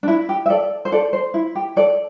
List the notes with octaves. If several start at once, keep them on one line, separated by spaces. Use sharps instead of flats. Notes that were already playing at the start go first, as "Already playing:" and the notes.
D4
E4
G4
E5
A4 D5
C5
A4 D5
C5
E4
G4
A4 D5